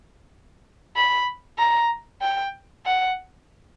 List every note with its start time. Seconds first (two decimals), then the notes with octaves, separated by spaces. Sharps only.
0.97 B5
1.59 A#5
2.22 G5
2.86 F#5